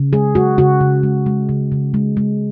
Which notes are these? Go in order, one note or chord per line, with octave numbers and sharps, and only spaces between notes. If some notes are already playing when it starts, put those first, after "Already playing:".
Already playing: C#3
G#3 G#4
G#3 F#4
C#3 F#4
C#3
G#3
G#3
C#3
C#3
G#3
G#3